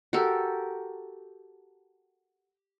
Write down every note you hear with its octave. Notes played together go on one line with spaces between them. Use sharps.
F#4 G4 A4 A#4